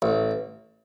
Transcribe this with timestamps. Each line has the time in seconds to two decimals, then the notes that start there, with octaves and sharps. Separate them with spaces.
0.02 A1